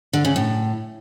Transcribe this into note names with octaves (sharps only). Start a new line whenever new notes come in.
D3
C#3
A2